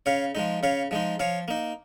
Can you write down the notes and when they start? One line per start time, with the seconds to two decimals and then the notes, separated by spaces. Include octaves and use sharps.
0.06 C#3 C#5 F5
0.35 F3 G#3 D#4
0.63 C#3 C#5 F5
0.91 F3 G#3 D#4
1.20 F3 C#5 F5
1.48 A#3 D#4